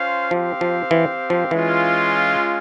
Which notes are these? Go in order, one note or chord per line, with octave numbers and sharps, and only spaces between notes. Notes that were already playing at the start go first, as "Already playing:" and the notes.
Already playing: C#4 F4 C5 F5
F3 C4 G4 C5 F5
F3
E3
F3
E3 G#3 C#4 F4